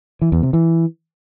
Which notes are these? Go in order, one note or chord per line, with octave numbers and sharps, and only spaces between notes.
E3
E2
C3
E3